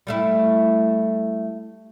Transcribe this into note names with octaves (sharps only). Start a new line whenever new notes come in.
G3 A3 E4